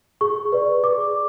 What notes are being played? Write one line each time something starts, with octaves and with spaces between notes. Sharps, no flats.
G#4 C#6
B4 D5
G#4 D6